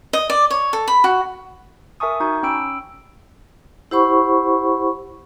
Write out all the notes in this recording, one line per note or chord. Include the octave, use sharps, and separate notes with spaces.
D#5
D5
C#5
A4
B5
F#4
A#4 E5 G#5 A5 C#6 D#6
D#4 F#4 C#6 G6
C#4 G5 B5 E6 D7
E4 G4 C5 F#5 B5 C#6